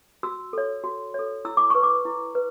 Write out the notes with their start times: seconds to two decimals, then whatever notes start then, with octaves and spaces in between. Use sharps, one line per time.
0.23 F#4 E6
0.53 A4 C#5
0.84 F#4
1.14 A4 C#5
1.45 E4 E6
1.57 D6
1.70 B4 C#6
1.83 D6
2.05 E4
2.35 B4